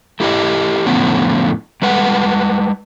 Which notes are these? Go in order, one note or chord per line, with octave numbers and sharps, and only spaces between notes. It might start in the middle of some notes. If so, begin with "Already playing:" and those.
A3 E4 G4 D#5
F2 A2 D3 F3 B3 C#4
G3 G#3 B4 F#5